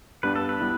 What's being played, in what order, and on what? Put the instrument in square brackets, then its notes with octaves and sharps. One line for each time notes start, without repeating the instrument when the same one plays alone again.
[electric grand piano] G2 G3 B3 D4 [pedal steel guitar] B4
[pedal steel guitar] A4
B4
[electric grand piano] G3 B3 E4